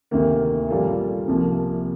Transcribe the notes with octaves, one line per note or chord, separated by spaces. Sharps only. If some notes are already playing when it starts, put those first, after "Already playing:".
D2 C3 D#3 A#3
A#2 G3 A#3 F4 A4
C2 C3 F3 A#3